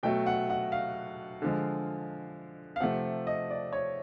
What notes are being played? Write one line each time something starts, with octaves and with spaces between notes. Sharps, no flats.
B2 F#3 A3 G5
F#5
F#5
F5
D3 F3 G#3
F5
C3 F3 A3 F#5
D#5
D5
C#5